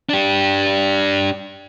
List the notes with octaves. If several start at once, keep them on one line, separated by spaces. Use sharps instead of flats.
D4 G4